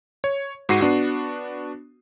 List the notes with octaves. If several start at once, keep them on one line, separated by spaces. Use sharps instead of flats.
C#5
G#2 F#4 C7 D#7
B3 D4 F#4